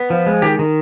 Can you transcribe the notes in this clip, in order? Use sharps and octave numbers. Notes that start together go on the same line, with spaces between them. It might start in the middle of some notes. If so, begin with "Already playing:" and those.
Already playing: B3
F3
G#3
D#3 G4
D#3